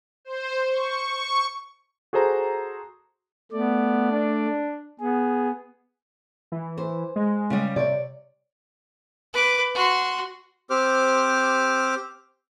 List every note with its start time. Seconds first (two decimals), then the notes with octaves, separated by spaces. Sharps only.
0.25 C5
0.69 C#6
1.06 C#6
2.13 F#4 G#4 A4 C5 A#5
3.52 A3 B3 D5
4.11 D4
5.00 B3 G#4
6.52 E3
6.78 C5
7.16 G#3
7.50 C#3 G3
7.76 C3 C#5 D5
9.33 B4 D6
9.75 F#4 C6
10.70 C4 G4 C5 D6 F6